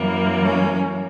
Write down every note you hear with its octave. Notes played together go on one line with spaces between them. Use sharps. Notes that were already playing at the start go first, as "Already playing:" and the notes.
Already playing: F#2 E3 G3 A#3
C#4